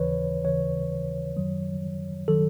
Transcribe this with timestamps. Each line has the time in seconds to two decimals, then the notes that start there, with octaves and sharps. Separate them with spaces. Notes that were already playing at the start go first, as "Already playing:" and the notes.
Already playing: D#2 C#3 E3 B4 C#5
0.45 D#2 C#3 E3 C#5
1.36 F#2 D#3 F#3
2.28 D#3 F#3 A4